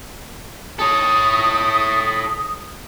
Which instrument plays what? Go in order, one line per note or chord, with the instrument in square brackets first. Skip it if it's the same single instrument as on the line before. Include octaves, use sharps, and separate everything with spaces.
[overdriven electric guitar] A4 C#5 [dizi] D#6